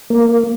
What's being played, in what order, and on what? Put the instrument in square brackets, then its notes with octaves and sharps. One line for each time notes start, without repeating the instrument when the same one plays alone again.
[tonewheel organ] A#3